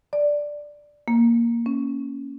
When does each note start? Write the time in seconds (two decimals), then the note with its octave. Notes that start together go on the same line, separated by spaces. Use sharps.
0.13 D5
1.08 A#3
1.66 C#4